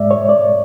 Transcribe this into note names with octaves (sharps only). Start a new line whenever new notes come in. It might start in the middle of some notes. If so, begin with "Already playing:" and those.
Already playing: G#2 G#3 D5 E5
C#5
D5